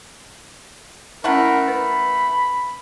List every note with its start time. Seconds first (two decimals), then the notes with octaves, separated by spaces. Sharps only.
1.24 A3 C#4 E4 A#4 F#5 B5
1.68 B4 B5